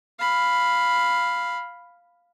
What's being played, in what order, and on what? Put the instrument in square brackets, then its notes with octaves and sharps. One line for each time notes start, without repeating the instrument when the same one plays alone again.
[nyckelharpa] F5 B5